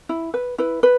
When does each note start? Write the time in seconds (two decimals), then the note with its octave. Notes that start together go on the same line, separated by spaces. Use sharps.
0.09 E4
0.34 B4
0.58 E4 B4
0.83 B4